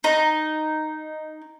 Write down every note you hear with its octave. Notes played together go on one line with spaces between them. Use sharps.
D#4